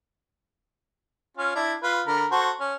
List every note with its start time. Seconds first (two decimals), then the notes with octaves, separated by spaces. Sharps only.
1.37 C#4 F4
1.55 D4 E4
1.83 F4 B4
2.07 D3 A#4 B5
2.31 F#4 A4 C5
2.60 C#4